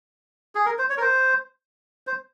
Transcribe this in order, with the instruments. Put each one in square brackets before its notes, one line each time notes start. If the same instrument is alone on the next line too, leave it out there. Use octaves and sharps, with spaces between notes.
[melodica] G#4
A#4
C5
C#5
A#4
C5
C5